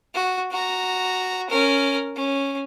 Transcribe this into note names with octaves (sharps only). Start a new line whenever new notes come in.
F#4
F#4 A#5
C#4 A#4
C#4